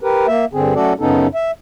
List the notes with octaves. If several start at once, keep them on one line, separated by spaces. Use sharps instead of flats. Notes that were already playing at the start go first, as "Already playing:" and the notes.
G4 A#4 B4
A#3 E5
G2 D3 C4 G#4
F#3 A3 C#4 F#4 A4 D5
F#2 C#3 B3 C#4 D#4 A4
E5